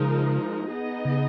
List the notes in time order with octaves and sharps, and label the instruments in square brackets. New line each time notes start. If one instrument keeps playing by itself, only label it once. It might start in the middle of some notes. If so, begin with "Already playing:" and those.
Already playing: [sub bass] C#3 [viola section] F3 G#3 D#4 A#4
[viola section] B3 D#4 G#4 D#5
[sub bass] C#3